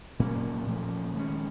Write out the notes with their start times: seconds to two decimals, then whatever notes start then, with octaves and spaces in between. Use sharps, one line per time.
0.19 A#2 F#3 A#3 C#4
0.67 A#2 F3 A3 C#4
1.15 D#3 G#3 C#4